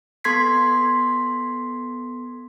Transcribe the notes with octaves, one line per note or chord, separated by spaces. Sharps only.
B3 A4 C6 G#6 B6 C7